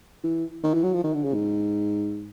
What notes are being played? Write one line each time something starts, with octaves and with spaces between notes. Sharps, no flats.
E3
D#3
E3
F#3
F3
D#3
D3
C#3
G#2